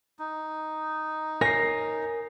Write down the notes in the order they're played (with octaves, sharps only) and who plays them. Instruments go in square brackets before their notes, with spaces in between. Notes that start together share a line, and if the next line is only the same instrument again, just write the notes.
[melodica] D#4
[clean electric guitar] A#4 C#5 G#5 [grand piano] A#6 C7